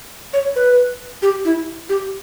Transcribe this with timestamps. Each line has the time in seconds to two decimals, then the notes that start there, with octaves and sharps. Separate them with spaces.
0.33 C#5
0.56 B4
1.22 G4
1.45 E4
1.89 G4